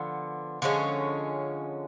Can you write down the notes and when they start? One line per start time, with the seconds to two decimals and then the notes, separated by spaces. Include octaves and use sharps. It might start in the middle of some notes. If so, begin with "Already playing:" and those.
Already playing: D3 F3 B3
0.62 D3 F3 G#3 C#4